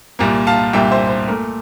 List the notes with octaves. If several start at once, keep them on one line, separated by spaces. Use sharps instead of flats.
C2 A#2 G3 A#3
F5 A5
C2 A#2 G3 A#3 E5 G5
C5 E5
C5
A#2 A3 A#4